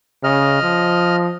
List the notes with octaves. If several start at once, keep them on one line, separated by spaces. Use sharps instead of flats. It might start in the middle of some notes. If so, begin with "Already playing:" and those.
C#3 D#5 F6
F3